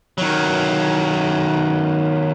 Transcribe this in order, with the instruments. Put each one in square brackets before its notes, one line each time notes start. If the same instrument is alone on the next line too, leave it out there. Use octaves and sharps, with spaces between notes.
[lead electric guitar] D#3 F#3